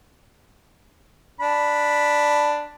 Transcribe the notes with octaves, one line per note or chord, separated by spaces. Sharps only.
D4 B5